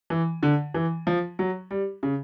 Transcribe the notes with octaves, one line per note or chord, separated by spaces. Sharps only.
E3
D3
E3
F3
F#3
G3
C#3